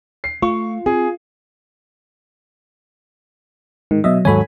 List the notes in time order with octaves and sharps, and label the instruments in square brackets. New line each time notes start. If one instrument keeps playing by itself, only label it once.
[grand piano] C7
[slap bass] A3 [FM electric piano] F4 [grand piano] C#6
[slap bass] C4 [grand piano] G#4
[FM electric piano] G#2 D#3
[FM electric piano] B2 D#5 E5 [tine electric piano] F#3
[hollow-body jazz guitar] D#2 G#2 F#3 [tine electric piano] A4 C#5 [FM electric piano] G#5 B5